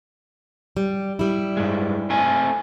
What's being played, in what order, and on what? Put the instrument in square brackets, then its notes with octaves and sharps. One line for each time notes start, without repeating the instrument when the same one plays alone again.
[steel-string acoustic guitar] G3
G3 E4
[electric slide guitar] G2 G#3
A3 C4 G#5